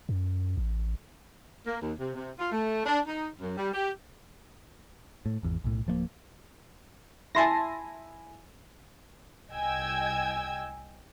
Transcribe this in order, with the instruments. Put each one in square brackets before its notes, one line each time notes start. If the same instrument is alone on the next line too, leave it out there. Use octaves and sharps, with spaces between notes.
[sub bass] F#2
A1
[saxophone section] A#3
D#2
C3
C3
F4
A3
D4
D#4
F#2
G3
G4
[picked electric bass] A2
G#1 E2
B1 A2
D1 F3 G#3 A#3
[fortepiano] E4 E5 G#5 [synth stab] A5 C6 A#6
[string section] C2 D#5 G5 G#5 E6 G#6